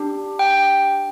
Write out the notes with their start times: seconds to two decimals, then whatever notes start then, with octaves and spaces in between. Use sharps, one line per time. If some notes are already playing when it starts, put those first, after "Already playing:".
Already playing: D4 G4
0.39 G5